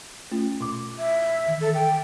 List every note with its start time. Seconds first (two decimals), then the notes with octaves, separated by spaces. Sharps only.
0.32 A3 C#4 F4
0.61 B2 D6
0.98 E5
1.46 D#3 E3
1.61 A4
1.74 G5